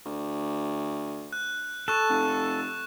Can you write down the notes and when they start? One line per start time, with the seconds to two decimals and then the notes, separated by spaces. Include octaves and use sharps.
0.05 D2
1.33 F#6
1.88 A4 C#6 F#6 E7
2.09 F1